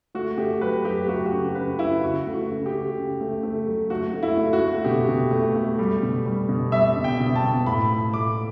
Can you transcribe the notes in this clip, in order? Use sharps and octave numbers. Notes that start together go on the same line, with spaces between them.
A3 F#4
A3 G4
F#3 B4
F#3 G4
A3 F#4
F#4
C#3 G4
C#3 B4
C#3 E4
C#3 F#4
A3
F#4
C#3
G4
C#3
C#3
A3
A3
F#3
A3 F#4
A3
E4
A3
F#4
A3
B2 G4
B2
A3
A3
G3
B2
G3
B2
G3 E5
B2
G5
B2
A5
B2
A2 B5
A3
A2 D6